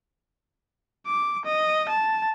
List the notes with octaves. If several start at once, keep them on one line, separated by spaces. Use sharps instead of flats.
D6
D#5
A5